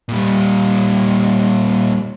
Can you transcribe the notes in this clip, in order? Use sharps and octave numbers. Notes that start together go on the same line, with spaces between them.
A#2 G3